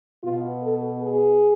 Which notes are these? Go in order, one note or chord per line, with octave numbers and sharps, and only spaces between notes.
B2 B3 F4
A4
G#4